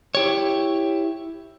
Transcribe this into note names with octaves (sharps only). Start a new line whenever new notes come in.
E4 G4 C#5